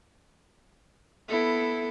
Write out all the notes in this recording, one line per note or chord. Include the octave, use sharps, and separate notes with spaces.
B3 E4 A4